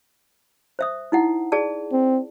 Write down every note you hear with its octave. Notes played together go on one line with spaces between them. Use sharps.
C5 E5 D#6
D#4 E4 F#5
G#4 D5 A5
C4